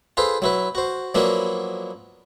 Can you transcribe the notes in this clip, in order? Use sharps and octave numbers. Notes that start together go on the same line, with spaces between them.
F4 G#4 A4 B4 C5
F#3 E4 B4
F#4 C5
F3 F#3 A#3 B3 D4 E4